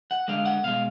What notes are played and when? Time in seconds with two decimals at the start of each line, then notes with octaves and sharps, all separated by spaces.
0.11 F#5
0.28 D3 G#3 F5
0.45 F#5
0.64 B2 G#3 F5